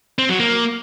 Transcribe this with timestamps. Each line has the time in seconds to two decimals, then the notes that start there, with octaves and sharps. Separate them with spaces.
0.19 C4
0.29 F#3
0.40 A#3